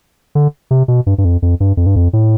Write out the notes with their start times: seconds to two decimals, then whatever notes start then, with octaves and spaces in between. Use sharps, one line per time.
0.35 D3
0.71 C3
0.88 B2
1.06 G2
1.18 G2
1.25 F2
1.42 F2
1.60 G2
1.77 F2
1.86 G2
1.96 F2
2.13 A2